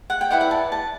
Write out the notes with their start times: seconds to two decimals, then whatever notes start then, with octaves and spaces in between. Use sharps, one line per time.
0.10 F#5
0.21 G5
0.31 E4 B4 D5 F#5
0.41 F#5
0.51 A5
0.72 A5